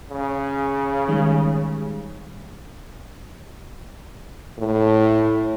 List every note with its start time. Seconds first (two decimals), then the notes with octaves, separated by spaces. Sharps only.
0.10 C#3
1.08 D#3 G3 G#3
4.58 A2